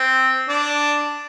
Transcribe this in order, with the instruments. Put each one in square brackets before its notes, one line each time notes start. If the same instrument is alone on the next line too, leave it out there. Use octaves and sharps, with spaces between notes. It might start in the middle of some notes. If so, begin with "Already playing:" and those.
Already playing: [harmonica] C4
D4